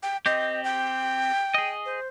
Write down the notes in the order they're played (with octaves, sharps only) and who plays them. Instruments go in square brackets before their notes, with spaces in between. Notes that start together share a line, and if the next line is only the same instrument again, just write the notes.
[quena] G5
[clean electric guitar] C4 G4 [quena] D#5
[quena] G5
[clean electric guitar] G#4 D#5
[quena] C5